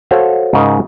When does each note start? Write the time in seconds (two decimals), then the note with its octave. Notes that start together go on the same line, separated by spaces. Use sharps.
0.11 F#4 A4 C5 C#5 F5
0.54 G#2 C#3 D#4 A#4